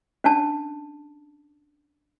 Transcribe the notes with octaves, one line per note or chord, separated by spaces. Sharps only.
C#4 D4 A5